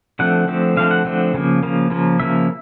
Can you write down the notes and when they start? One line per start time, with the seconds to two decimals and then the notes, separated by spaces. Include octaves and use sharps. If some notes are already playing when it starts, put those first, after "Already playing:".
0.19 D3 F3 A3 C4 F#5
0.48 D3 F3 A3 C4
0.76 D3 F3 A3 C4 F5
0.91 F#5
1.05 D3 F3 A3 C4
1.34 C#3 F3 A#3
1.63 C#3 F3 A#3
1.90 C#3 F3 A#3
2.20 C#3 F3 A#3 E5